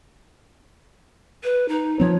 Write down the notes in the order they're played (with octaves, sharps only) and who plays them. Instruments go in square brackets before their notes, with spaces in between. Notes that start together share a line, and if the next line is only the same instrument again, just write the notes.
[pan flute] B4
D#4
[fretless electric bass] F3 C4 [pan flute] C#5